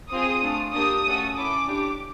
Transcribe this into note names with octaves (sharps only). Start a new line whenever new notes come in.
C4 F4 G#4 D#6
A3 D4 F4
A#3 D4 G4 D#6
A3 C#4 F#4 A4
C#4 E4 A4 D6
D4 G4